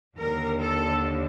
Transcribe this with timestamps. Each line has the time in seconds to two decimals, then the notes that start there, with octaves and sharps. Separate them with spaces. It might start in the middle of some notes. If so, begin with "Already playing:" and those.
0.17 D#2 D3 A#4
0.60 A4